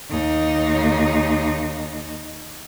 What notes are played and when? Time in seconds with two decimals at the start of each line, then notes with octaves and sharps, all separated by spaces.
0.10 D#2 D#4